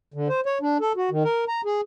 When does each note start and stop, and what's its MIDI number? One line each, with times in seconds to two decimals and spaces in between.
0.14 0.28 50
0.28 0.40 72
0.46 0.58 73
0.61 0.78 62
0.80 0.92 69
0.96 1.10 66
1.11 1.23 51
1.24 1.45 70
1.48 1.61 82
1.65 1.81 68